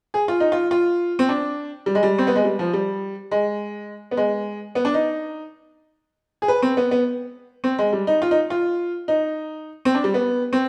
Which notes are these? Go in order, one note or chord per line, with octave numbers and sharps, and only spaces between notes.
G#4
F4
D#4
F4
F4
C4
D4
G3
G#3
G3
C4
B3
G#3
G3
F3
G3
G#3
B3
G#3
B3
D4
D#4
G#4
B4
C4
B3
B3
C4
G#3
G3
D#4
F4
D#4
F4
D#4
C4
D4
G3
B3
C4